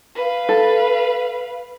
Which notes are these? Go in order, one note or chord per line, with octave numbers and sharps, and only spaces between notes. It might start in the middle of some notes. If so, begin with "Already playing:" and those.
B4 F5
A4